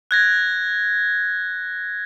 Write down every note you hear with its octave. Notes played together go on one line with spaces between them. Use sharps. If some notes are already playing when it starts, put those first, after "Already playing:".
F#6 G#6 A#6